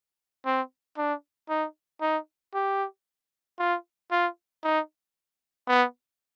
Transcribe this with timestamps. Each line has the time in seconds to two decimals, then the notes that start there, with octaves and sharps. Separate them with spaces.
0.45 C4
0.97 D4
1.49 D#4
2.01 D#4
2.54 G4
3.59 F4
4.11 F4
4.64 D#4
5.68 B3